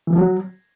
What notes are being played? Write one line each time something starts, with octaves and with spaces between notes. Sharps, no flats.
E3
F3
F#3